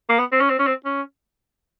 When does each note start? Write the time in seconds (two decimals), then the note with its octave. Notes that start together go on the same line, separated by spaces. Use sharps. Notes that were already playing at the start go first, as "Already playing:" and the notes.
0.09 A#3
0.19 B3
0.32 C4
0.41 C#4
0.50 C4
0.59 C#4
0.67 C4
0.85 C#4